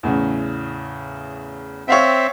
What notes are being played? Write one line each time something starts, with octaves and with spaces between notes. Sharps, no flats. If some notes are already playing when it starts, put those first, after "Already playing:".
E2 A2 C#3
C4 C#5 E5 F5 G5